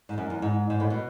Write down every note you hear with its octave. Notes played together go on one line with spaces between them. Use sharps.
G#2
F#2
E2
G#2
G#2
A2
B2